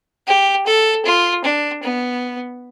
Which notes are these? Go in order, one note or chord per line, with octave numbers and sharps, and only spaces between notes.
G4
A4
F4
D4
B3